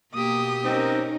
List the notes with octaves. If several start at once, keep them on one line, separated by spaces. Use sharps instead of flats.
B2 A#3 G4 D#6
C4 C#4 D#4 A#4